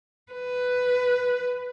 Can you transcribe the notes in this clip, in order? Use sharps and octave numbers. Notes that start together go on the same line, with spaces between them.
B4